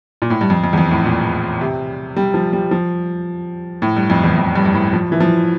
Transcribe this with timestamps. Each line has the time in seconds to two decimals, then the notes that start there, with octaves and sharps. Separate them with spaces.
0.22 A#2
0.30 A2
0.41 G2
0.50 F2
0.64 F2
0.73 E2
0.78 F2
0.91 A2
1.05 A#2
1.61 C3
2.16 G3
2.34 F3
2.53 G3
2.71 F3
3.82 A2
3.96 G2
4.10 F2
4.23 E2
4.38 F2
4.55 G2
4.66 G2
4.74 A2
4.93 F3
5.12 E3
5.20 F3